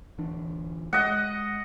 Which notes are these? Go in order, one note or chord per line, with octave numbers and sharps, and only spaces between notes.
D1 E3 D4
G#3 D#5 F#5